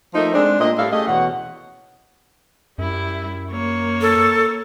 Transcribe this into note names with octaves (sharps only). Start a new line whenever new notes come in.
F3 A3 A#3 D#4
G#3 C4 D4
A#2 A3 C4 D#5
A2 G3 D4 A4 E5 F5
A3 C#4 G4 G#4 D#5
E2 B2 C#5 F#5
F#2 G3 E4
A#3 C#5
A4